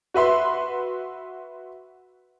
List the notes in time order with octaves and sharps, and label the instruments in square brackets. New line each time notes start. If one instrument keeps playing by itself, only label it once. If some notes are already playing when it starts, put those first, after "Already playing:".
[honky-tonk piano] F#4 B4 E5 C6